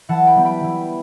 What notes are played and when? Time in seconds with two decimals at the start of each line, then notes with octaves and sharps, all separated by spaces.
0.09 E3 F#5 A5
0.27 G5 B5
0.36 G3 B3
0.45 G5 B5
0.64 E3